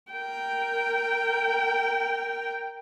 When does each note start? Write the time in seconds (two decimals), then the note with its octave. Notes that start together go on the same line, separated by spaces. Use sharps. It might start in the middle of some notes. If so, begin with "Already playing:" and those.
0.12 A#4 G5